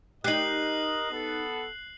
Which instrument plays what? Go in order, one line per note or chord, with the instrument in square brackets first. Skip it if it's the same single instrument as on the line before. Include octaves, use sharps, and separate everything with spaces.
[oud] D#4 G4 [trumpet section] A#4 D#5 [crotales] F#6 C7 F#7
[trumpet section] B3 A4